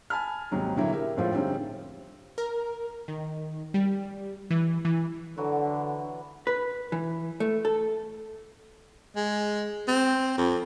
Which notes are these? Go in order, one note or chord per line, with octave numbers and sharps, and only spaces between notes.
G#5 A5 B5 F6
D#2 G#2 C3 F#3 G3
A#1 D3 F#3 A#3 E4 E5
G4 A#4 E5
F2 A2 F3 G#3 C4 F4
D3 G3 C4 C#4 D#4
A#4
D#3
G3
E3
E3
D3 E3 F#3 F#4
B4
E3
A3
A4
G#3
C4
F2